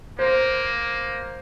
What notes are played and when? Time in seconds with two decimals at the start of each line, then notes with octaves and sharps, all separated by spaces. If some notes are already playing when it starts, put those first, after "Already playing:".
0.19 A#3 C5